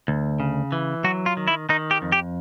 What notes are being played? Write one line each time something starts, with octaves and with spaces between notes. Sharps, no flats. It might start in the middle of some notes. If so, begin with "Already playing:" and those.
D2
C#3
E3
F#3 F#4
F4
D#3
E4
D#3 D#4
G4
F2
G4